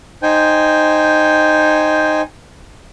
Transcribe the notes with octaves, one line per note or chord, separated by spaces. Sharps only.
D#4 C5 G5 G#5